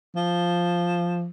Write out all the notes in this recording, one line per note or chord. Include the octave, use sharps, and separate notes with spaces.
F3